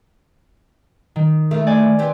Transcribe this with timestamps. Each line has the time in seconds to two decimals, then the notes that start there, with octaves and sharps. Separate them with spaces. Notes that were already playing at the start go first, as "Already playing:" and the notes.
1.16 D#3
1.51 A3 E4 A#4
1.67 D5 G#5
1.99 B3 C4 G4